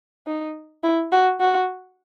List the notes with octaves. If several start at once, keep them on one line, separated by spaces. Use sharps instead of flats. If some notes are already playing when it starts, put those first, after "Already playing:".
D#4
E4
F#4
F#4